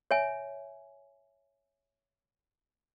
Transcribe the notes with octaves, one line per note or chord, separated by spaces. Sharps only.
C#5 E5 G#5